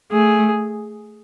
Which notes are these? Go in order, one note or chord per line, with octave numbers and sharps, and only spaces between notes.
A3 G#4